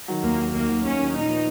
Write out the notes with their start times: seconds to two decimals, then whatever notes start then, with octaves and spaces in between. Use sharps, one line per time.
0.08 D#3 F#3
0.23 D#2 A#3
0.38 D#3 F#3
0.53 D#2 A#3
0.68 D#3 F#3
0.83 D#2 C#4
0.99 D#3 F#3
1.13 A#2 D#4
1.28 F3 B3